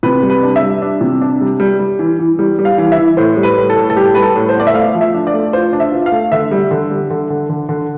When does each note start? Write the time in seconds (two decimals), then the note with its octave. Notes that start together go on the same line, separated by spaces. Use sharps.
0.03 C3 B4
0.22 G3
0.30 B4
0.43 D4
0.56 E5
0.62 G3
0.82 D4
1.01 C3
1.21 D4
1.41 G3
1.60 G3
1.79 G3
1.99 E3
2.19 E3
2.39 G3
2.59 G3
2.65 F5
2.78 E3
2.92 E5
2.98 E3
3.17 A2 C5
3.36 G3
3.43 B4
3.57 A2
3.70 A4
3.76 A2
3.90 A4
3.96 G3 G4
4.15 G3 B4
4.23 A4
4.36 A2
4.49 C5
4.56 B3 D5
4.67 E5
4.74 A3 F5
4.95 F3
5.01 E5
5.14 D4
5.27 D5
5.34 A3
5.53 F4 C5
5.73 D4
5.80 E5
5.92 F4
6.06 F5
6.12 A3
6.32 D3 E5
6.51 G3
6.71 D3
6.91 G3
7.11 D3
7.30 D3
7.50 D3
7.69 D3